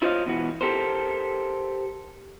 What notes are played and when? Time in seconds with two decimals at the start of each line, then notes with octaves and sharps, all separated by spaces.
0.02 E4 F4 C5 C#5 D#5 F5
0.26 B2 E3 F#4
0.61 G4 A4 A#4 C5